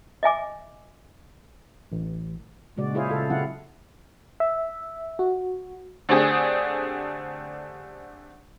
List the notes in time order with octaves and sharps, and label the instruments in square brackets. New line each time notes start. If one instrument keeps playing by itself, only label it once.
[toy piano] D#5 E5 G#5 D6
[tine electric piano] A1
[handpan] A#2 C#3 G#3 F#4 D5
E4 F4 G#4 C5 C#5 F5
C#3 A4 F5
C#3 F#3 C4 E4 F5 F#5
[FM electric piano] E5
F#4
[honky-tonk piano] D3 A3 C4 D4 G4 G#4